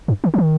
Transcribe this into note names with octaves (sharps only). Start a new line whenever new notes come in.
G2
D#3
E3
D#3